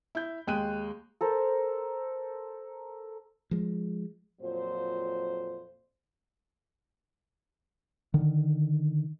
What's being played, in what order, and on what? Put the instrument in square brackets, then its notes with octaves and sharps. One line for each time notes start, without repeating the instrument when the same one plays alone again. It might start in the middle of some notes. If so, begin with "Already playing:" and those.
[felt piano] E4 G6
D#2 G#3 G5 F#6 D#7
[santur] A4 A#4 C5
[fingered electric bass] F3 G#3
[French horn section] F2 A#2 F#3 C5
[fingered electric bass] D3 D#3